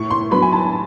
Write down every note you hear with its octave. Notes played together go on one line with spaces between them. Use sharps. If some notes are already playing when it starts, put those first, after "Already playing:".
Already playing: A2 C#6
C6
F#3 B3 D4 B5
G#5
A5